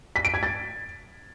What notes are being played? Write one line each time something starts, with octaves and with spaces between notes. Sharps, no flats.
B6
D7
G#6
A6